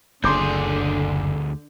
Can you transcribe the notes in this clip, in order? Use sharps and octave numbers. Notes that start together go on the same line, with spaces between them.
F#1 D2 D3 G#4 C6 D6 G6